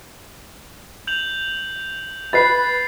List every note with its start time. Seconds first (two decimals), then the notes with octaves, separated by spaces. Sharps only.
1.07 G6 F7 F#7
2.33 B4 B5 A6 C7